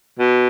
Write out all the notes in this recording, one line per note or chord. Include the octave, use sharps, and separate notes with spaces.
B2